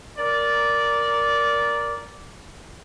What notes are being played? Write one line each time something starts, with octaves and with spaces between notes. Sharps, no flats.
A#4 D5